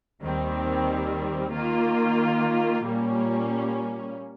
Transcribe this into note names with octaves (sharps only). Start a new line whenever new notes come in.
D#2 D#3 G3 C4
D#3 A#3 F4
A#2 G3 A#3 C#4